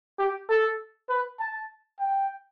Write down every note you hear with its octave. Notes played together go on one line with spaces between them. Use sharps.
G4
A4
B4
A5
G5